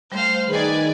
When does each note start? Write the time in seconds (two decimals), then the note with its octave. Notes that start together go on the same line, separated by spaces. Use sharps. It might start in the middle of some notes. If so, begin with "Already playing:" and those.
0.12 G3 A3 C5 F5
0.49 D#3 G#4 B4 D5 G#5